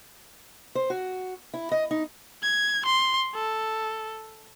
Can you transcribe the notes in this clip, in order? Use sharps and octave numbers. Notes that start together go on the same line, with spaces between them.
C5
F#4
E4
D#5
D#4
G#6
C6
A4